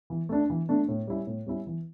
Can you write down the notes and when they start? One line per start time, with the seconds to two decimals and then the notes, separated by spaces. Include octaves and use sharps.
0.10 E3
0.29 A3 D4
0.50 E3
0.69 A3 D4
0.88 A2
1.07 G3 C#4 E4
1.27 A2
1.46 G3 C#4 E4
1.67 E3